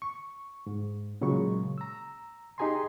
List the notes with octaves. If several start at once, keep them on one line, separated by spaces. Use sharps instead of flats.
C#6
G#2
A#2 C#3 F#3 G#3 C#6
A#5 E6
D#4 G4 G#4 G#5 A#5 C6